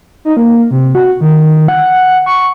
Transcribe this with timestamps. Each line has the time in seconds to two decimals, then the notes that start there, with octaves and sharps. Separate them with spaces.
0.25 D#4
0.37 A#3
0.71 C3
0.95 F#4
1.21 D#3
1.68 F#5
2.26 C#6